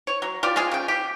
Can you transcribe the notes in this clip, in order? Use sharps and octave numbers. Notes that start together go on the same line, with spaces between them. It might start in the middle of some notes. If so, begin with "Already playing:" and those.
C#5
F#3
F4 G4 D5
G#3 F4 G#4
C#3 G5
G4